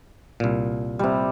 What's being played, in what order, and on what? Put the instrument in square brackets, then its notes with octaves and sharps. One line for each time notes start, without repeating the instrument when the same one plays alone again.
[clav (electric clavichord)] C2 A#2
[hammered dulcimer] C3 G3